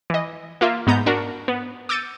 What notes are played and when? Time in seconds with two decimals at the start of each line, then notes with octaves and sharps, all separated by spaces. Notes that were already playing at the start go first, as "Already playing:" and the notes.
0.10 E3 D#5
0.61 A#3 F4 E5
0.87 G#2 B3 A#5 G6
1.06 D4 F#4 A#4
1.48 B3
1.89 D6 E6 G6 A6 C#7 D#7